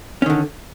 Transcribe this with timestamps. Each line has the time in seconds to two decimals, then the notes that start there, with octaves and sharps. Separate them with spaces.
0.22 C#4
0.26 D#3
0.30 D3